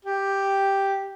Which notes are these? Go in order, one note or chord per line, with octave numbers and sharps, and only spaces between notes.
G4